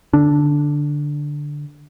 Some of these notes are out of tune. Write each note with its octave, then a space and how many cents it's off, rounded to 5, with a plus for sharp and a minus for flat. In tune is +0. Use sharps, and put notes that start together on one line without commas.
D3 +0 D4 +0